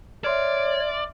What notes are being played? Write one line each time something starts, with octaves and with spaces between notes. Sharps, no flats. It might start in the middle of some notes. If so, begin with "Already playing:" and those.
C#5 D5 E5 C6 F6